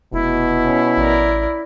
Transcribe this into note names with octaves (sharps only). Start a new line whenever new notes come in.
F1 B2 E4
C#4
A1 A#4 D5